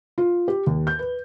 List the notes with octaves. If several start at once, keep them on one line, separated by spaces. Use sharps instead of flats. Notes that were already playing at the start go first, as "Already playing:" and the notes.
F4
G4
D#2
G6
B4